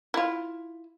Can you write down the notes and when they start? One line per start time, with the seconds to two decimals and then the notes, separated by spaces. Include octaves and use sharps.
0.14 E4 F4